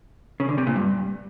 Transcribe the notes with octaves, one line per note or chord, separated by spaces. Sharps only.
C#3
D3
C3
A#2
G2